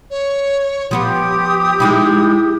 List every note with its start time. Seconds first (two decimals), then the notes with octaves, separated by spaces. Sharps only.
0.10 C#5
0.91 F3 B3 F4 G4 D#6
1.80 G#3 D#4 E4